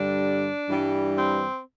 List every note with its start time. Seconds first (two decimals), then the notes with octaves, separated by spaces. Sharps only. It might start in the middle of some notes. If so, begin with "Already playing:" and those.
Already playing: G2 D3 G3 D4
0.68 G2 E3 G3
1.16 C4